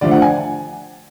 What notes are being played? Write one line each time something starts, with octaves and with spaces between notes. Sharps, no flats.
D3 F3 A3 D5
F#5
G#5